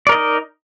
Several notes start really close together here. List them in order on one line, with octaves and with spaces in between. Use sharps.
D5 A#4 D#5 D#4